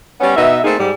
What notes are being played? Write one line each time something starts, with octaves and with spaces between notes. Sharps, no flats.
G3 B3 C#4
B2 B3 D#4 E5
A3 A#3 C4 D#4 G#4
G#2 G3